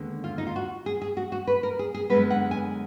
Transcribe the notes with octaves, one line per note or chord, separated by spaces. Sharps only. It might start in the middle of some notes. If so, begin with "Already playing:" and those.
Already playing: D#2 D3 G#3 B3
F4
D#4
F4
F#4
G#4
G#4
F#4
F#4
B4
A#4
G#4
G#4
F#2 D3 G#3 B3 B4
F#5
G#5